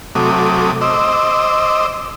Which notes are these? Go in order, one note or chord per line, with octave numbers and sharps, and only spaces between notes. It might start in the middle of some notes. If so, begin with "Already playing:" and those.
C3 F#3 A3 D6 D#6
C5 D#5 D6 E6